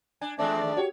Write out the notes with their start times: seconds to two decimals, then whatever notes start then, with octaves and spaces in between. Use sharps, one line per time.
0.21 D4 G#5
0.38 E2 G#3 A3 C4 D4 D5
0.62 D#3 F3 A6
0.77 F#4 G4 C#5